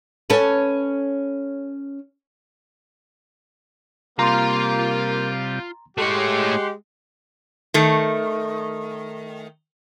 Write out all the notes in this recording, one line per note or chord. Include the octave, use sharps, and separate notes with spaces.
C#4 A4 B4
C3 G3 A#3 F4 A#5 C6
G#3 A3 G4 C#5 F#5 C6
D#3 A3